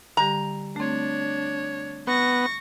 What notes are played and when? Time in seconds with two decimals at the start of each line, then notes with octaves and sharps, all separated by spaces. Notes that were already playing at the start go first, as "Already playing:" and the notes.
0.17 D3 G3 G4 A#5
0.76 A3 C4 D4 C#5
2.07 B3 C#6 A#6